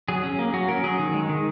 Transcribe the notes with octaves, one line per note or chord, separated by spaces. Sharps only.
F#3 G#4
C#4
A#3
F#3 F#4
C#4 A#4
F#3 G#4
D#3
G#3
D#3